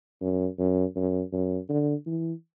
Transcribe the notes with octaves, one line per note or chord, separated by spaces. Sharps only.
F#2
F#2
F#2
F#2
D3
E3